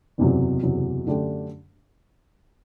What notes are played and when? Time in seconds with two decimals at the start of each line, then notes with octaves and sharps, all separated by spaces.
0.18 F#1 E2 C3 F#3
0.62 F#1 E2 C3 F#3
1.06 F#2 D3 A3 D4 G4